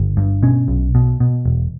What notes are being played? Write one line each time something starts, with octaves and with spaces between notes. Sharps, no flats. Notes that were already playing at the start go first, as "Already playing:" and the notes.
Already playing: G1
G2
B2 C#4
B1
B2
B2
E1